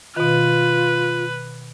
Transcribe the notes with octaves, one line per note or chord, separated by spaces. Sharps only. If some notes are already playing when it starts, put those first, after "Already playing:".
B2 D#3 F4 B4